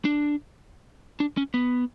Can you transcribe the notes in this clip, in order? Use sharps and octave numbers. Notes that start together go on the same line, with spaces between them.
D4
D4
C#4
B3